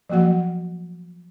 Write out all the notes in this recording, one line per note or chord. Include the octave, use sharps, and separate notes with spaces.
F3 F#3 A#3 F#4 F#5